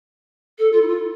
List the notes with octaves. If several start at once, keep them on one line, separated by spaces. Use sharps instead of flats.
A4
F4
E4
F4